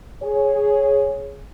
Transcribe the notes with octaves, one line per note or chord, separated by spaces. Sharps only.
G#4 C#5